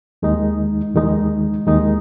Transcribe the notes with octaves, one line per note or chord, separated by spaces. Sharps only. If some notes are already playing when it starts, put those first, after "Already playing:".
D#2 D#3 G#3 D#4
D#2 D#3 G#3 D#4
D#2 D#3 G#3 D#4